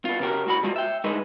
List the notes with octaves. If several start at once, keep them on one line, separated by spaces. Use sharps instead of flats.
B3 F4
C#3 C#4 F#4 G4 A#4
A2 F#4 B5
G3 G#3 F4 F#4
E5 G5
D2 G#3 D#4 E4 B4 D#5